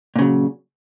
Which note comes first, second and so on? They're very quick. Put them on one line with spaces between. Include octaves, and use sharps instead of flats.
A#2 C#3 F#3